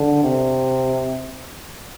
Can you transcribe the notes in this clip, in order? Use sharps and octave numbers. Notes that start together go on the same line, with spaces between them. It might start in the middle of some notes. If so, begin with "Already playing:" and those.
Already playing: D3
C3